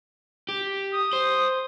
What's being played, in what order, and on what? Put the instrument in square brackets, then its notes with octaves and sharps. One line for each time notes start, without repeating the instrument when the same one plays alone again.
[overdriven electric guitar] G4
[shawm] D#6
[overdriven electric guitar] C5